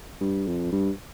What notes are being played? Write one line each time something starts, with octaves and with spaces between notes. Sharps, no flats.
G2
F2
G2